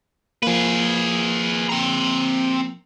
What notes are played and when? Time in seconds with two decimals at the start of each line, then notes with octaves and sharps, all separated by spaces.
0.43 F3 A#3 G#4 B4
1.69 C4 A#5